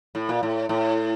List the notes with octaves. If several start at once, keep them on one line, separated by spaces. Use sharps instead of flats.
A2
A#2
A2
A2